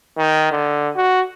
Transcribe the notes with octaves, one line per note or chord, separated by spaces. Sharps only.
D#3
D3
F#4